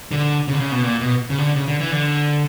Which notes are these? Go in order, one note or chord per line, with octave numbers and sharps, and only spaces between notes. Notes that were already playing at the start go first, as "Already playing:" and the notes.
D3
C#3
D3
C#3
B2
A#2
B2
C#3
D3
C#3
D3
E3
D3